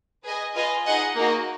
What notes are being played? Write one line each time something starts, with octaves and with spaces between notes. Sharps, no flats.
G#4 B4 D#5 G#5
F4 B4 D#5 G#5
D#4 G#4 D#5 F#5
A#3 D#4 F#4